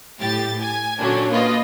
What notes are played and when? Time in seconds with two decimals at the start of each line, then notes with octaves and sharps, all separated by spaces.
0.19 A2 G4 A6
0.60 G#5
0.99 A#2 D3 F#3 C#4 D4
1.30 A#3 F4 B4 D#5